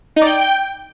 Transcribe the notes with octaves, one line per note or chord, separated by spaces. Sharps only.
D#4
D5
G5